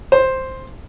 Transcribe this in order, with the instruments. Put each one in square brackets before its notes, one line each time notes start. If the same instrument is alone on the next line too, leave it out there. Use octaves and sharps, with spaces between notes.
[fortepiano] C5